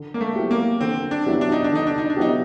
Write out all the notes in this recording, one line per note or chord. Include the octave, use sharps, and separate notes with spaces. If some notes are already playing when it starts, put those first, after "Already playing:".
Already playing: D3
A#3
A3
F#3 B3 E4 G4
A#3
D3 C4
D4
F#3 B3 E4 G4
D4
D#4
D4
D3 D#4
D4
D#4
D4
F#3 B3 D#4 E4 G4